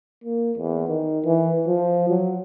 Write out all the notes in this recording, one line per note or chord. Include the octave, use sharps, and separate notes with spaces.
A#3
E2
D#3
E3
F3
F#3